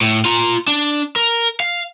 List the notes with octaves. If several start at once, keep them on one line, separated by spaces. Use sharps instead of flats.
A2
F4 A#5
D4
A#4
F5